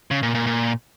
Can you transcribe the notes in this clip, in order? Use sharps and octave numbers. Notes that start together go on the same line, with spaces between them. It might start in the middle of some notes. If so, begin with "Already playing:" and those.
C#3
A#2
A#2
A#2